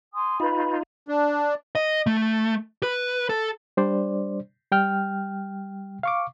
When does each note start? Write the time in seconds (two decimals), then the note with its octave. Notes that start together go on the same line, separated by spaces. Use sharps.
0.14 G#5 C6 D#6
0.40 D#4 F4 B4 B5
1.08 D4
1.75 D#5
2.07 A3
2.83 B4
3.29 A4
3.77 G3 D4 C5 D5
4.72 G3 G5 F6
6.03 F5 C#6 D6